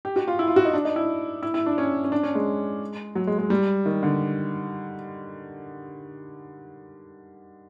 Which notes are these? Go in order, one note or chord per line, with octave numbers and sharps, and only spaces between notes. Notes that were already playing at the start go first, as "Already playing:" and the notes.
G4
F#4
F4
E4
F4
F#4
D#4
D4
D#4
E4
E4
E4
D4
C#4
C#4
D4
C#4
G#3
F#3
G#3
G#3
G3
D#3
D3